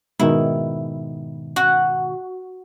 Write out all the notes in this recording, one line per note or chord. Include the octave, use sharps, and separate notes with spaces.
G#2 B2 D#3 E4
F#4